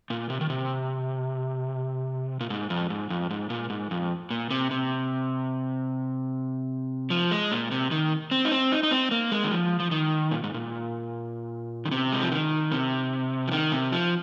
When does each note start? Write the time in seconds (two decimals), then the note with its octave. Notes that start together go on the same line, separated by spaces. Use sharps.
0.10 A#2
0.30 C3
0.41 D#3
0.50 C3
2.40 A#2
2.50 G#2
2.70 F2
2.90 G#2
3.10 F2
3.30 G#2
3.50 A#2
3.70 G#2
3.91 F2
4.30 A#2
4.50 C3
4.71 C3
7.10 F3
7.31 G#3
7.52 A#2
7.71 C3
7.91 D#3
8.31 C4
8.45 D#4
8.51 C4
8.72 D#4
8.83 D#4
8.91 C4
9.11 A#3
9.32 G#3
9.44 D#3
9.51 F3
9.80 F3
9.91 D#3
10.31 A#2
10.44 G#2
10.54 A#2
11.86 D#3
11.91 C3
12.12 G#3
12.22 F3
12.32 D#3
12.72 C3
13.48 F3
13.52 D#3
13.72 C3
13.92 F3